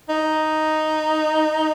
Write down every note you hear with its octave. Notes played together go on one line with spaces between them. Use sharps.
D#4